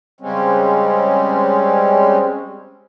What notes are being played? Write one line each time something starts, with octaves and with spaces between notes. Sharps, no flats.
C#3 G3 G#3 C4 C#4